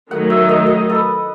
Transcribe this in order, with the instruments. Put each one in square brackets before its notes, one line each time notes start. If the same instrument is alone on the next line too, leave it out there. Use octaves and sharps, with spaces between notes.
[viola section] D#3 F#3 A3 D#4 [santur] F#5
[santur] E5
D#5
D#5
A4
B4